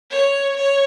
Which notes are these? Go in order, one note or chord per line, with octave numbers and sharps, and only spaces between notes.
C#5
C#5